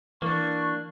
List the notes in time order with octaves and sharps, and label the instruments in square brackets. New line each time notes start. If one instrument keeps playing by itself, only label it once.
[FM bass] E3 [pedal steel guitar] A#3 D4 [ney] C#6